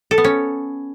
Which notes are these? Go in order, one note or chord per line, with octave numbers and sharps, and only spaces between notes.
A4
B3
C#4